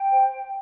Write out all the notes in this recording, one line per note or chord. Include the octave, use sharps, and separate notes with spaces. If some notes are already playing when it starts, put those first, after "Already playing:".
Already playing: G5
C5